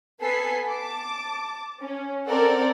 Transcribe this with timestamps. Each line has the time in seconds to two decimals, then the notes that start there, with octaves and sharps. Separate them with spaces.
0.21 B3 A4 B4 G#5 B6 C7
0.70 A5 D6
1.81 C#4
2.27 C4 A4 A#4 D5 F#5